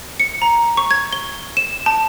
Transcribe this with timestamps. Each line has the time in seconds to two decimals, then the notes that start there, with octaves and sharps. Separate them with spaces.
0.20 C#7
0.42 A#5
0.77 C#6
0.91 G#6
1.13 G7
1.57 E7
1.86 A5